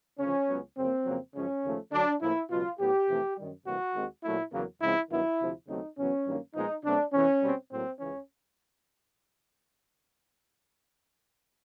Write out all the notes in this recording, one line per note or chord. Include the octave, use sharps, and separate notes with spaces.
D2 C#3 F3 C#4
C#2 C#3 F#3 B3
F#2 C#3 F3 A#3 C4
F2 C#3 F#3 A#3
F#2 C#3 F3 G#3 C#4
D#2 C#3 F3 A3
D2 D3 F#3 D4
A2 F3 A#3 E4
C#2 B2 F#3 F4
A2 F#3 B3 G4
F2 C3 E3 A3
F#2 D#3 G3
D2 C3 E3 G3 A#3 F#4
D#2 D#3 G#3 C4
A#2 F#3 A3 E4
E2 C#3 F#3 A#3
C#2 C#3 F3 G#3 C4 E4
G2 D#3 F#3 B3 E4
D2 C3 F3
D#2 C#3 F#3 A3 C4 D#4
E2 C#3 F#3 B3 C#4
G2 D#3 F#3 A#3
A#2 F3 G#3 B3 D#4
B2 F#3 A3 C4 D4
E2 C3 E3 C#4
B2 G3 C4
A2 F#3 A#3 C4
C#2 C#3 E3 C#4